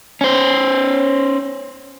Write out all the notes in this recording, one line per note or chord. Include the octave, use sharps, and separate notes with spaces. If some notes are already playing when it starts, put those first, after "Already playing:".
C#4 C5